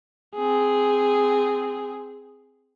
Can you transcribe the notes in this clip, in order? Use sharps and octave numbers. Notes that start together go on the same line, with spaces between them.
C4 G#4